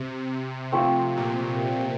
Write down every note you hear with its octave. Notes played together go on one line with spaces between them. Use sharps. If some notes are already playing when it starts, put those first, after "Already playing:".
Already playing: C3
F3 A3 C4
A#2